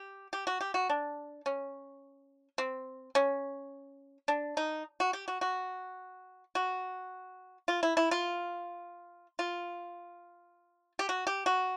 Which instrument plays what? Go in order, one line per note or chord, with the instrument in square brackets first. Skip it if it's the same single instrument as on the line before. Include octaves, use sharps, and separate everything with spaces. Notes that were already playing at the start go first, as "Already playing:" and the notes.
Already playing: [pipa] G4
G4
F#4
G4
F#4
D4
C#4
C4
C#4
D4
D#4
F#4
G4
F#4
F#4
F#4
F4
E4
E4
F4
F4
G4
F#4
G4
F#4